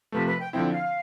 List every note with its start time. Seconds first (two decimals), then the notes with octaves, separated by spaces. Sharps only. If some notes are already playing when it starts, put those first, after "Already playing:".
0.12 C3 F3 A3 B4
0.26 B4
0.40 G5
0.53 D3 F3 C4 E4 G5
0.73 F5